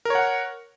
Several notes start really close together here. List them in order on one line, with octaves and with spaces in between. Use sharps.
A#4 C#5 F#5